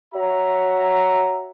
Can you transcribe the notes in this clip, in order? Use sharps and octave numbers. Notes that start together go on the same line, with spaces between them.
F#4 C#5 E5 A#5